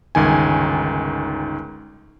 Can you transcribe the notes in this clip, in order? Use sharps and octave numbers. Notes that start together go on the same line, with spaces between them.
G1 C#2 D#3 G#5